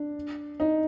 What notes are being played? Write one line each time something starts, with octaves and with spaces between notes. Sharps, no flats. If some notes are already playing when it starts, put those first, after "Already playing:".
Already playing: D4
D#4